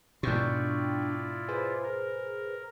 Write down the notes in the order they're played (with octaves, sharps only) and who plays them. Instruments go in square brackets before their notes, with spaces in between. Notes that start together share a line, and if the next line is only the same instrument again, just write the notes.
[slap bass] G#2 B2 [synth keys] D4 G5 C#6 [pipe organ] E4 F4 D5
[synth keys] G#4 B4 C5
[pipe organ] A#4